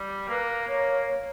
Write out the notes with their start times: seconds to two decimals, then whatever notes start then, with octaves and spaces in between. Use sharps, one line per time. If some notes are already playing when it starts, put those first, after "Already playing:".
Already playing: G3
0.28 A#3 B4
0.67 A#3 C#5